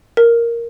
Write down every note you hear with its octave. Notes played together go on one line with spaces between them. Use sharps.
A#4